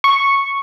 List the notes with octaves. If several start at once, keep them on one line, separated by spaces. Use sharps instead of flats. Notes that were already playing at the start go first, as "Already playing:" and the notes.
C#6